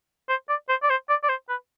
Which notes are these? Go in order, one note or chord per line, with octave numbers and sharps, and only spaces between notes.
C5
D5
C5
D5
C5
D5
D5
C5
B4